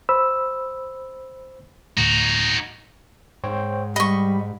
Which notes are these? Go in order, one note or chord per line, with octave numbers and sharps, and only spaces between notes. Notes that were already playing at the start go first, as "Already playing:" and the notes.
C5 B5 E6
D2 A2 D#4 F#4
G#2 C5 C#5 G5
G3 D#5 B5 C#6 B6